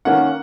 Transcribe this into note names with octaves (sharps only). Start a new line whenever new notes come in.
D#3 A#3 C#4 F#5